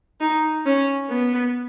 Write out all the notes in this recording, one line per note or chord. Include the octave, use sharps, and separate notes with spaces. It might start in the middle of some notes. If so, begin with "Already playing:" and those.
D#4
C#4
B3